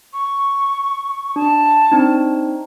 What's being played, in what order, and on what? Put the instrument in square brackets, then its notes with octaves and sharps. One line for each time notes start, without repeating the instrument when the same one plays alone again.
[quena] C#6
[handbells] D4 [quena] A5
[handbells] C4 D4 D#4